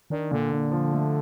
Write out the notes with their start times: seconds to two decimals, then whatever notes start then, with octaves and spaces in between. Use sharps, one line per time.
0.10 D#3 D4
0.31 A#2 D3
0.51 A#2
0.72 F3
0.92 A3